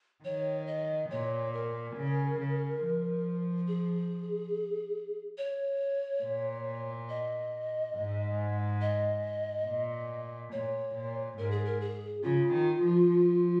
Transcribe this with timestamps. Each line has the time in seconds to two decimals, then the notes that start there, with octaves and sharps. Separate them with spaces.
0.24 D#3 C#5
0.67 D#5
1.10 A#2 C#5
1.53 A#4
1.96 C#3
2.39 C#3
2.82 F3
3.68 G#4
5.38 C#5
6.23 A#2
7.09 D#5
7.95 G#2
8.81 D#5
9.66 A#2
10.52 A#2 C#5
10.94 A#2
11.38 G#2 A#4
11.51 G#4
11.65 A#4
11.81 G#4
12.23 C#3 F4
12.53 D#3
12.81 F3
13.10 F3